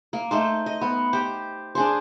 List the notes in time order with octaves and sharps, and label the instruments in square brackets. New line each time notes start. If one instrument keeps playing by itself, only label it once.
[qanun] A#3
A3 D#4 C5
D#5
B3
G4 C5
D4 G#4 C5